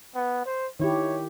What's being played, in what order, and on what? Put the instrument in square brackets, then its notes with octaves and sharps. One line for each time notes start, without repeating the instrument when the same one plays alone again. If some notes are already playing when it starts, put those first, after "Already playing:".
[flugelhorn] B3
C5
[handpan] D#3 E4 G4 [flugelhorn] C#5